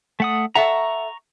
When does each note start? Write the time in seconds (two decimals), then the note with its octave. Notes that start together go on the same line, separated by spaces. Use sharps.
0.20 A3 F#5 D#6
0.55 A4 E5 F#5 A#5 C#6